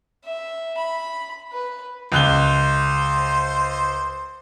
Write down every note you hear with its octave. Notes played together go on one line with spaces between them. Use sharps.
E5
B5
B4
C#2 C5 F#6 G7